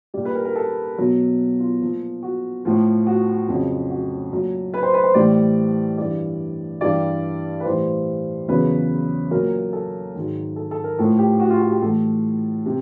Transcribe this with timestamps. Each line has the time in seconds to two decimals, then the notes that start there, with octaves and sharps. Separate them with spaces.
0.14 G3 D5
0.17 A#2
0.25 B4
0.35 A#4
0.45 A#4
0.56 A4
0.98 B2 F#3
1.60 F4
1.81 A#2 F3
2.23 F#4
2.65 A2 F3
3.07 F#4
3.48 F2 C#3 F#3
3.90 F#4
4.32 A#2 F#3
4.74 B4
4.83 C5
4.94 B4
5.04 C5
5.14 A2 E3 G3 D5
5.98 G2 E3 G3 D5
6.81 G2 E3 G3 D5
7.60 B4
7.65 A2 E3 G3 C5
8.48 E2 C#3 F#3 B4
9.31 A#2 F#3 A#4
9.73 A4
10.15 G#2 D#3 F#3
10.56 A4
10.71 A4
10.84 A#4
10.98 A2 F3 A4
11.19 G4
11.40 F#4
11.50 F4
11.61 F#4
11.71 G4
11.82 A2 E3 G3 A4
12.66 C3